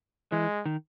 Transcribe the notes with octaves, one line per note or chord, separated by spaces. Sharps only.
E3 G#3
D#3